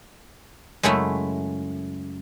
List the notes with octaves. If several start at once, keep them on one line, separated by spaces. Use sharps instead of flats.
F#2 C#3 G#3 A3 C#4 E4